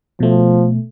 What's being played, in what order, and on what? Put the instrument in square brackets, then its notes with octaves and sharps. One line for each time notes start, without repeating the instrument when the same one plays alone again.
[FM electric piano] B2 A3 [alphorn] F3